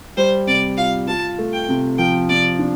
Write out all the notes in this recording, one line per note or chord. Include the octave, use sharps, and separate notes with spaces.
G3 C5
C3 D5
F4 F5
F4 A5
A3
G5
C3
F3 G5
C3 D5
D4